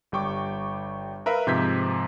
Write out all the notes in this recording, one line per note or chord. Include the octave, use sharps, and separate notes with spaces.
G1 G3 G5 C#6 D6
A#4 B4 E5 F5
G#2 C3 F3 G6 G#6 B6